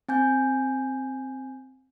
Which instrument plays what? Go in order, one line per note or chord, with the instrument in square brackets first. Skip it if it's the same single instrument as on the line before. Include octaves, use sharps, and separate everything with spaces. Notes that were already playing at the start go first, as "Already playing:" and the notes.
[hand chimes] C4 G#5 G6